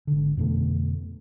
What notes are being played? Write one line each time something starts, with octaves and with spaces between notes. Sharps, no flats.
G#1 D3
F2 B2 D3 A3